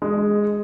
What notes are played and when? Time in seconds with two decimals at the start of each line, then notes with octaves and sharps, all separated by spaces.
0.02 G#3